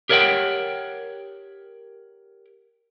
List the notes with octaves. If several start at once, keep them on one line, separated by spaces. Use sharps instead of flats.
G4 A#4 C#5 D#5 F#5 G5